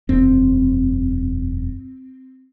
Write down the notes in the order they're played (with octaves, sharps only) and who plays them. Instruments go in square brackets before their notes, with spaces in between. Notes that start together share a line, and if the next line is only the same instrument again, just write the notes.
[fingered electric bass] E1 F#2 D4 [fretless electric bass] C4